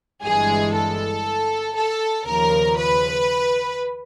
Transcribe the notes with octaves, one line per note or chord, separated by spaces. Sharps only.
G1 G2 E3 G#3 G#4
A4
A4
D#2 C#3 F3 A#4
B4